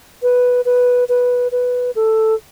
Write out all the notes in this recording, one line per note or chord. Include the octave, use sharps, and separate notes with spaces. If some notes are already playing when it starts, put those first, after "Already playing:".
B4
B4
B4
B4
A4